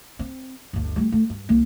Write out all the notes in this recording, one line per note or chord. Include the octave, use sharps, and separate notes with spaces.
C4
G1 D2
G3 A3
A3
G2
C2 A#3